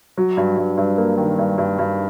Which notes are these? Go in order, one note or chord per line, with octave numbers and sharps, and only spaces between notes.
F#3
G2
G2
G2
A#3
D#3
G2
G2
G2